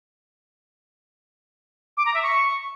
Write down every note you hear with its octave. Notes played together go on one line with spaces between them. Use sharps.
D6
A#5
E5
C#6